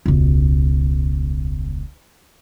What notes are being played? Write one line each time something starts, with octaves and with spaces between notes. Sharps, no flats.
E1 C#2